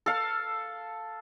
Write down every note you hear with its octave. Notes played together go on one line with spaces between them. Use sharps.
A4 F5